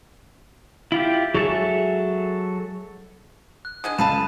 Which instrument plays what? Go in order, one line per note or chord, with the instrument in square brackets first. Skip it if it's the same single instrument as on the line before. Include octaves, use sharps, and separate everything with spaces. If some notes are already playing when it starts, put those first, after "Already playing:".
[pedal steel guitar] E4 F4 G4
[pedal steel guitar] F#3 A4 E5 [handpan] G#4
[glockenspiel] F#6
[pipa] D3 G#4 D#5 [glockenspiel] D#6 F#6
[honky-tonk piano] C#2 [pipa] A4 F5 A5 [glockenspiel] B5 D#7 E7